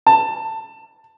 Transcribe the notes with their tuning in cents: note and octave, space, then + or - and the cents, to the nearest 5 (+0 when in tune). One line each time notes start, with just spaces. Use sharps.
A5 +15